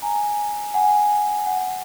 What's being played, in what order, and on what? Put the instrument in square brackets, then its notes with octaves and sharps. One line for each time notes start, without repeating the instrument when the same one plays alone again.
[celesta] G#5 A#5
F#5 G#5
F#5